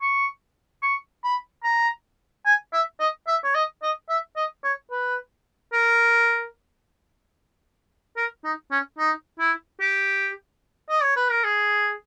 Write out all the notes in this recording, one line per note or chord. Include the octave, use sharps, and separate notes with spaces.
C#6
C#6
B5
A#5
G#5
E5
D#5
E5
C#5
D#5
D#5
E5
D#5
C#5
B4
A#4
A#4
D#4
C#4
D#4
E4
G4
D#5
C#5
B4
A#4
G#4